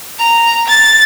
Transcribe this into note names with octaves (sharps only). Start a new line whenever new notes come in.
A#5
A6